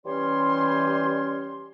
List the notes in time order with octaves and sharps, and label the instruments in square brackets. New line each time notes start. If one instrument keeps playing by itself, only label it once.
[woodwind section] E3 G3 C#4 G4 C#5 C6